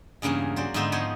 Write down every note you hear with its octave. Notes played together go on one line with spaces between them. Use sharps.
E2 G2 C#3 A#3 G#4
F#3 C5 D5
G#2 D3 B3 D#4 C5 E5
F3 B3 C5 C#5